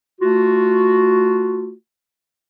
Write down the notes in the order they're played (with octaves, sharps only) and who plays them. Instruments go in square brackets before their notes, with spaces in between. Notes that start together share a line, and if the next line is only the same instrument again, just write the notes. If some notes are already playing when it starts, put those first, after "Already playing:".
[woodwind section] A3 F4 F#4